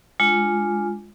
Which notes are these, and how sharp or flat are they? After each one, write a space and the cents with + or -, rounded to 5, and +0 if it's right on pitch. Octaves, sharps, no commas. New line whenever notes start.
G#3 +0 D4 +0 F4 +0